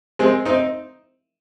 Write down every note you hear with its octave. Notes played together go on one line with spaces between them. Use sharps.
G#3 C4
C4 D#4